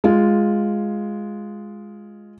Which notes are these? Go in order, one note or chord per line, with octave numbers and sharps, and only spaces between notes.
G#3 F4